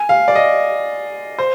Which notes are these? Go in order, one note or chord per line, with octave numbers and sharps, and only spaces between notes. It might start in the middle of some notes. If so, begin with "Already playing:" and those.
Already playing: G#5
F5
D5
D#5
C5